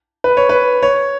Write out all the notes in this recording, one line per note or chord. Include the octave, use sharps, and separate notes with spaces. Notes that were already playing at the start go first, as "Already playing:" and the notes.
B4
C#5
B4
C#5